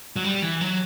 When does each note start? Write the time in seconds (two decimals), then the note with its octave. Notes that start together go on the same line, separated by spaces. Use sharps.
0.16 F#3
0.24 G3
0.42 E3
0.61 F#3